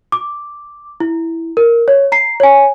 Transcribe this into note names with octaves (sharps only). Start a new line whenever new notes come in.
D6
E4
A#4
C#5
A#5 C7
C#5 G#5